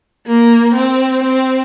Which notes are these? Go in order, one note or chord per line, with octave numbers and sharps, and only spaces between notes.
A#3
C4
C4